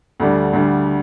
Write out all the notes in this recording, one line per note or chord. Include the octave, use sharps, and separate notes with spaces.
D2 D3 G3 D4
D2 D3 G3 D4